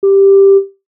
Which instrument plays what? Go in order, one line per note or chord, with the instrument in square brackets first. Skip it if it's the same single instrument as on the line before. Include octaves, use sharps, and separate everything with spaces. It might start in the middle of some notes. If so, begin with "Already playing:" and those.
[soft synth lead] G4